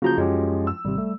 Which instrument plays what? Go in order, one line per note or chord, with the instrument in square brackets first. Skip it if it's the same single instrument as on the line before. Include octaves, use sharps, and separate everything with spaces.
[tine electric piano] C#3 A#5 G6 [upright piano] F3 F#3 [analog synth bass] A#3
[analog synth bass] F#2 [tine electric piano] G#3 C#4 G4
[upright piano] E6
[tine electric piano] G#1 C3 [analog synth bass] G3
[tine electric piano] A3